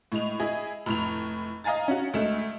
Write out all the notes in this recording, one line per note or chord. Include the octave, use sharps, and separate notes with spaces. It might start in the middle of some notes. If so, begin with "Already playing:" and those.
A2 G#3 F7
E4 G#4 D#5
F1 A2 F7
D#5 F5 G#5 A#5 A6
C#4 F#4
D2 G#3 A3 E7